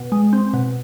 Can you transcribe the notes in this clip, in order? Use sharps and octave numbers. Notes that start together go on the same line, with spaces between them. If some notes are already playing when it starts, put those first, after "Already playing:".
Already playing: B2
G#3
C4
B2